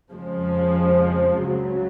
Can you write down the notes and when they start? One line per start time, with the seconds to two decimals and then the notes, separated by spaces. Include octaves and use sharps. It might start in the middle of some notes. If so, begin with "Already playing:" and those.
0.12 F2 C#3 F3 G#3
1.40 C#2 C#3 F#3